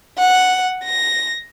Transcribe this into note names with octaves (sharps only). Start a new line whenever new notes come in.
F#5
A#6